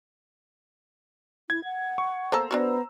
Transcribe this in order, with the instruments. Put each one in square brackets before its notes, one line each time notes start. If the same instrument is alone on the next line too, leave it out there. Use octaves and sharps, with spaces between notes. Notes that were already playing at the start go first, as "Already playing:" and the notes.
[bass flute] E4 [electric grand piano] G#6
[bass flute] F#5
[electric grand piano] C#6
[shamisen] A#3 B3 A4 [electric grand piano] C5 A#5 E6
[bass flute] B3 [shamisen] D4 F4 F#4